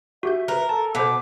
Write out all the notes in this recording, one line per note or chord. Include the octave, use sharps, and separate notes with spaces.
F#4 G4 E5 G6
A#4 B4 F#6
A4 A5
B2 A4 C5 D6